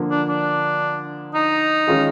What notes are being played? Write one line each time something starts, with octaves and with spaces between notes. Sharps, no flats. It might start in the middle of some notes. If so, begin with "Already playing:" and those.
Already playing: D3 F3 A#3
D4
D4
D#4
D#3 G#3 C#4 F4 G#4